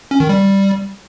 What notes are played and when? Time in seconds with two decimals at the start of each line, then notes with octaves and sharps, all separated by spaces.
0.11 C#4
0.20 D#3
0.29 G3